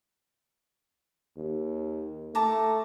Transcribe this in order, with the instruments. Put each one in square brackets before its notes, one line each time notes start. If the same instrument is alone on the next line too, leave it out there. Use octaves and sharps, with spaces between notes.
[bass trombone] D#2
[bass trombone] A3 [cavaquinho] A5 A#5 D6